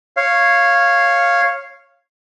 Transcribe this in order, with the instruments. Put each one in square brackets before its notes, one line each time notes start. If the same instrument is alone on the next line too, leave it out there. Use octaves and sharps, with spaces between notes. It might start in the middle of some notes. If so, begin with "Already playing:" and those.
[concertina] C#5 F5